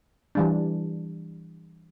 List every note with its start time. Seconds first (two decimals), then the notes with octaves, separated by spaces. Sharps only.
0.35 E3 G3 D4